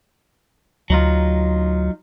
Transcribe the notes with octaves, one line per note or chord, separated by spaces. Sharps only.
D2 F#3 D#4 F4